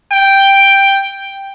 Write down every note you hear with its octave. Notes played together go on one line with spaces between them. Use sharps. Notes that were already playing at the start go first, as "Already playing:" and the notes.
G5